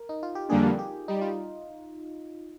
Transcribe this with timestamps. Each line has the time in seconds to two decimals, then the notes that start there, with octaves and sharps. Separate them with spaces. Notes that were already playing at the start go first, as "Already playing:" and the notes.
Already playing: A#4
0.09 D#4
0.23 F4
0.35 G4
0.49 F2 D3 G3 A#3 D4 G#4
0.79 G4
1.08 G3 D#4
1.21 F4